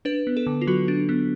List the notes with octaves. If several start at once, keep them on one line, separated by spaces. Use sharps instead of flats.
D4 B4
B3
A4
D3
F4
F#3 F#4
D4
B3